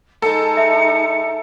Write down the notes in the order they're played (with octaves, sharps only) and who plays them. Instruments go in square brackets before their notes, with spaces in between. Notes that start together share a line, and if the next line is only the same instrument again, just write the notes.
[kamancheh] G#3 D#4 [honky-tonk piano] A4 [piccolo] C#7
[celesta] E5